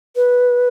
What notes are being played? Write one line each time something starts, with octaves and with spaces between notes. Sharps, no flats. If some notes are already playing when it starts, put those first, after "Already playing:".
B4